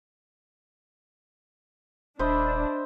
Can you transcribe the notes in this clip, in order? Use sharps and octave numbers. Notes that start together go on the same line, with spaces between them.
D#1 D4 C5 D#5 E5 B5